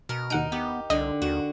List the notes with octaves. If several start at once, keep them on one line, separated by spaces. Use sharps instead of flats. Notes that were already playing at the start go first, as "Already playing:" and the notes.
B2 A#4
D#2 D#4 F#5 D7
B3 G4
C2 D3 D#5
D#2 F#4